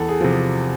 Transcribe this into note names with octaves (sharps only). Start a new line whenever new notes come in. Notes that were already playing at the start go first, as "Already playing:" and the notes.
Already playing: E2 A4
G#4
C3 F3
G#4